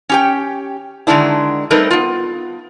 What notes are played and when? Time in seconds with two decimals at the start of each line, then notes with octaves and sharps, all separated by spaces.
0.09 C#4 G4 G5
1.07 D3 D#3 G#3 D4 E4
1.70 G3 A3 C4 D#4 A#4 B4
1.91 B3 F4